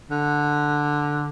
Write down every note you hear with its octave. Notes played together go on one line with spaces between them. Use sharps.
D3